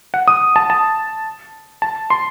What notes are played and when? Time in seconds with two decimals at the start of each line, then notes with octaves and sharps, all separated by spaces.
0.14 F#5
0.28 D#6
0.56 A5
0.70 A5
1.82 A5
2.10 C6